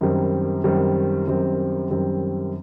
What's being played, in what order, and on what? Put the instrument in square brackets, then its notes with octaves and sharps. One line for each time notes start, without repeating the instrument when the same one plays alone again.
[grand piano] F#2 D#3 G3 C4
F#2 D#3 G3 C4
F#2 D#3 G3 C4
F#2 D#3 G3 C4